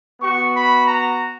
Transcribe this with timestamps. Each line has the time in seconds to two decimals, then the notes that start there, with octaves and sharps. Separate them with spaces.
0.20 B3 F#4 C#6
0.55 B5
0.88 A#5